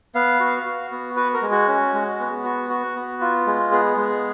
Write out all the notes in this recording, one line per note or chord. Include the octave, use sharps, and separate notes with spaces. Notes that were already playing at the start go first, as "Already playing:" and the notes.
B3 F5
F#4
F#4
B3
F#4 B4
A#4
G#3
F#4
C#4
G#3
B3
F#4
F#4
B3
F4
G#3
B3 G#4
G#3